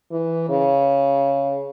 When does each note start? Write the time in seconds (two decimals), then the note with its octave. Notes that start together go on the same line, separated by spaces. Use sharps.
0.11 E3
0.49 C#3